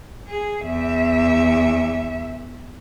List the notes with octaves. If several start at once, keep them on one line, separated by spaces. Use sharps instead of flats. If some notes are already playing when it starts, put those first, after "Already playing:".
G#4
E2 E5